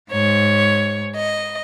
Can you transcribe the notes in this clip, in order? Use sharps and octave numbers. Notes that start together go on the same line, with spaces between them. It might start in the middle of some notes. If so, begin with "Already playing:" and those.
G#2 C#5
D#5